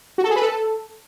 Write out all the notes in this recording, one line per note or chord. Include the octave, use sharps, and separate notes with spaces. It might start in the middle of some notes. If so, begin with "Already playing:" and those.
F#4
A4
G#4
B4
A4